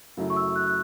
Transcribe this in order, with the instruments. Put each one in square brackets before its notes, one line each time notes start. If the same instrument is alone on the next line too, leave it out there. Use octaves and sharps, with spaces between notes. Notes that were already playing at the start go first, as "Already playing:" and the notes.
[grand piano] F#2 C#3 F#3 A3 E4
[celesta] C#6
E6
F#6
F#6